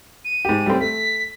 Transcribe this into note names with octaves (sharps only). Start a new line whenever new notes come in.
D#7
G#2 G4
G3 A3 C4
A3 B6